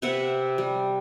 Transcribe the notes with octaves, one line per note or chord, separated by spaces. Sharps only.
C3 B4 E5 F#5
G3